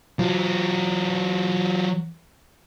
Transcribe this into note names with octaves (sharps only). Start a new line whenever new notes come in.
F#3 F4